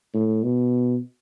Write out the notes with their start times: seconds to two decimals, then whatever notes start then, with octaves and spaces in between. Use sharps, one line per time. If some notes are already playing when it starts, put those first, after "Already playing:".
0.14 A2
0.44 B2